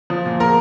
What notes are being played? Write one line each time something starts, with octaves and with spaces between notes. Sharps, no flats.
F3
A#2
A#2 A#4 A#5